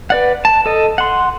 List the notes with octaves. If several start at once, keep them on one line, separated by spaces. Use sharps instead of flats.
B4 D5 F#5
A5
A4 D#5
F#5 C6